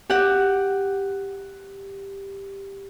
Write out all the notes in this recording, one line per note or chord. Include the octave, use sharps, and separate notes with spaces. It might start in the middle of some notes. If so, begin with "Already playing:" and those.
G4 F#5